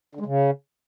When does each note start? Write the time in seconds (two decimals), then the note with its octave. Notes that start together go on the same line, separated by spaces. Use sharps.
0.15 D3
0.21 G#3
0.26 C#3